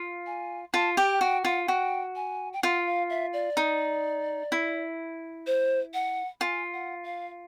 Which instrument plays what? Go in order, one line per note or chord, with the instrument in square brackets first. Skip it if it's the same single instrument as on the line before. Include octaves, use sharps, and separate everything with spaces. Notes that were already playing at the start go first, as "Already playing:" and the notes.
Already playing: [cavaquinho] F4
[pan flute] G#5
[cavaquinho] F4 [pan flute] A5
[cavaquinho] G4 [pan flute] G5
[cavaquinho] F#4 [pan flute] G5
[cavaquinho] F4 [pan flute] F#5
[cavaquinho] F#4 [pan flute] G5
[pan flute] G#5
G5
[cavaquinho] F4 [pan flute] F#5
[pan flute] F5
E5
D5
[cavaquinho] D#4
E4
[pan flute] C5
F#5
[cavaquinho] F4 [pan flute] G#5
[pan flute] F#5
F5